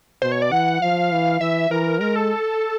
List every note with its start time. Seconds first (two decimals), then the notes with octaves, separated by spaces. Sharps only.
0.22 B2 C5
0.32 C#5
0.42 D5
0.52 E3 F#5
0.81 F3 F5
1.12 E3
1.41 E3 E5
1.70 E3 A#4
2.01 G#3 A#4
2.16 A4